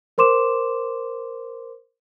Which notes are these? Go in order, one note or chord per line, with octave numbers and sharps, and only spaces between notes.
A#4 C5 C6 D6 E7